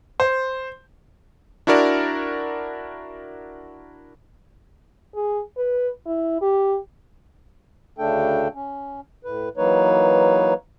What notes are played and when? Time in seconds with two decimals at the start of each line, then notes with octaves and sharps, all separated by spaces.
0.20 C5
1.67 D4 E4 F#4 A#4 D5
5.14 G#4
5.57 B4
6.06 E4
6.41 G4
7.98 D2 C#3 A3 D4 A4 G5
8.55 C#4
9.24 A2 B4
9.57 E3 F#3 A#3 D#4 B4 C#5